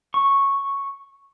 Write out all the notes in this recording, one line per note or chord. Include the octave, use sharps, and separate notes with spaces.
C#6